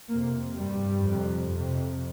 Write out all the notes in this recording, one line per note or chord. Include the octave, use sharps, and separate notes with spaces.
F2 C3 A#3
G2 G3
F2 C3
F2 C3